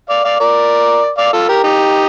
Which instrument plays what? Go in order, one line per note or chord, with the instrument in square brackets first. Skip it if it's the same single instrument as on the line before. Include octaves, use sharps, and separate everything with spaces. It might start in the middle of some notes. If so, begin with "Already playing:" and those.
[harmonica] D5 F5
D5 F5
A#4 D5
D5 F5
F4 A4
G4 A#4
D#4 G4